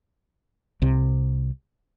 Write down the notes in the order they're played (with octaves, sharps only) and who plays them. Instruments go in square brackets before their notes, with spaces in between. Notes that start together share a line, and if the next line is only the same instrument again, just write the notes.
[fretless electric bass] C2 C3